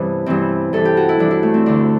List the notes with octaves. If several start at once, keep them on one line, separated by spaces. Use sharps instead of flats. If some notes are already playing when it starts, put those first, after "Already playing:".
Already playing: G2 C3 E3 B3
G2 E3 C4
G2 E3 A4
G4
F#4
E4
G2 E3 D4
E4
A3
C4
D2 D3 D4